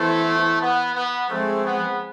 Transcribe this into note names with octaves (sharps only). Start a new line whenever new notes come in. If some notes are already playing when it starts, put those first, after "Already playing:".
Already playing: E3 A3 B3 E4 A4 C5
B3
B3
F3 G#3 A3 C4 G#4
B3